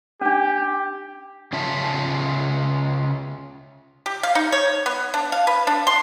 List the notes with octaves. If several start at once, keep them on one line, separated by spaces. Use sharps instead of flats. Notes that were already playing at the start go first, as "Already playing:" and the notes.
C#4 D4 G4
C#3 C#4 F4 E5 A5
G4
F5
D#4
C#5
B3
D4
F5
B4
D4
C6